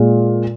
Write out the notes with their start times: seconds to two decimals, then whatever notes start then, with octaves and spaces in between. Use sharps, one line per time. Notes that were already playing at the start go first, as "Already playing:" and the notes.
Already playing: A#2 G#3